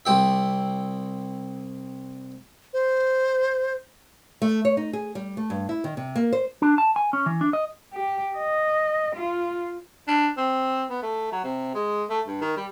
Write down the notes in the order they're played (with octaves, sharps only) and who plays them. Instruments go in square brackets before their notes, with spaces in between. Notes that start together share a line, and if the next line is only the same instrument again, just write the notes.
[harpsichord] C2 G4 E5
[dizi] C5
[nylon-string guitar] A3
C#5
D#4
G#4
G3
A3
G2
E4
D#3
C3
A#3
C5
[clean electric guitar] D4
A5
G#5
C#4
E3
D4
D#5
[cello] G4
D#5
F4
[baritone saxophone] D4
C4
B3
A3
F#3
C3
G#3
A3
G2
D#3
G3